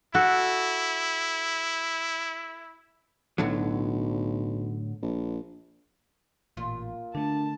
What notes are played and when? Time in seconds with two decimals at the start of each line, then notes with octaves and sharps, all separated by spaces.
0.15 E4 F#4 A4
3.38 B1 A2 D3 F#3
5.02 A#1
6.57 A1 A#2 F4
7.15 D3 A3 D4 A5